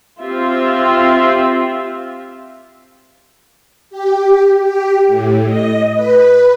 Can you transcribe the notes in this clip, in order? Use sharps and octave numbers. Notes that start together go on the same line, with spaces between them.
C4 F4 G4 E5
G4
G4
A2
D#5
B4